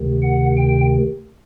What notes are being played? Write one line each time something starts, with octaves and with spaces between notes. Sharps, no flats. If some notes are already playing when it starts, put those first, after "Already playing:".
Already playing: D2 C3 D#3
F#5
G5